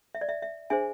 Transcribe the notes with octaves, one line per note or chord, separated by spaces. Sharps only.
E5
D5
E5
E5
D4 G#4 C5 E5 G#5